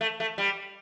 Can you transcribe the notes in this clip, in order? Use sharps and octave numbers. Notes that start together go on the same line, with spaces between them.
A3
A3
G3